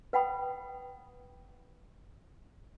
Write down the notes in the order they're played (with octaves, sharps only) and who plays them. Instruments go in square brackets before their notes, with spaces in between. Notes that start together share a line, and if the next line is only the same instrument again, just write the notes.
[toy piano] B4 F#5 G5 B5 D#6